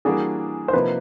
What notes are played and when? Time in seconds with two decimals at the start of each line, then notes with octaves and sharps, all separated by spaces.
0.05 E3 G3 A#3 D4 F#4 G#4
0.68 C5
0.73 C3 F3 A#3 D#4 B4